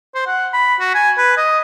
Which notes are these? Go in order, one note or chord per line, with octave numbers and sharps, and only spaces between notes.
C5
F#5
B5
F#4
G#5
B4
D#5